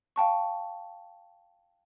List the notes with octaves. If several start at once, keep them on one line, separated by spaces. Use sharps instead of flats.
F5 G5 A5 C#6